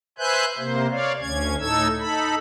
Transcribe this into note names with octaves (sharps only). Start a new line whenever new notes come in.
B4 C5 E5 G#5 F#6 G6
C3 A#3 C5
C#5 D5 F5
D2 C#4 G#6
A2 D#4 A4 E6 G#6
D#4 A4 B5